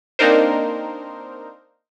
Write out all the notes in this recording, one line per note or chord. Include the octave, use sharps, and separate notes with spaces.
A#3 C4 D4 D#4 A#4 C5